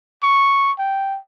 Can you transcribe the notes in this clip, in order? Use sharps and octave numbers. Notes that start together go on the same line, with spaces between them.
C#6
G5